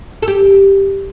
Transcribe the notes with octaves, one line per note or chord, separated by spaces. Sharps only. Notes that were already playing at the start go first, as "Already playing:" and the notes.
A4
G4